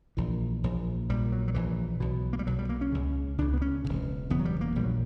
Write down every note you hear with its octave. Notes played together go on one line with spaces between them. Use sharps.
A#1 A#2 E3
A#1 A#2
A#1 A#2 G3
F#3
F#3
A#1 A#2 E3
B1 B2
A#3
G3
B1 B2 F#3
G3
A#3
C#4
C#2 C#3
C#2 C#3 D4
B3
C#4
E1 E2 C#3
E1 E2 C#3 B3
F#3
G3
A#3
A#1 A#2 G3
F#3